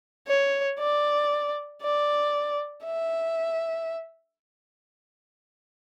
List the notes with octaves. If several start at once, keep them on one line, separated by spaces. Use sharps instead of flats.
C#5
D5
D5
E5